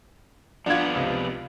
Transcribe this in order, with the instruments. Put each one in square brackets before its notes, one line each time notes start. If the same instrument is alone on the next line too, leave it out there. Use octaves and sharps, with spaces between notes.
[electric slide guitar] F3 B3 D5 [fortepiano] D4 F4 [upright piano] F#5 G#6
[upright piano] C#2 C3